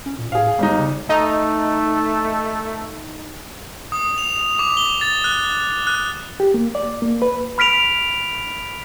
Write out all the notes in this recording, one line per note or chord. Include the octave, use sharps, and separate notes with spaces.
C#4
A#2
A2 G#4 F5
G1 G#3 D#4
C#3
A3 D#4
D#6
F7
D6
G7
A6
F#6
F#6
G4
A#3
D5
A#3
B4
B5 F6 B6 D7 F7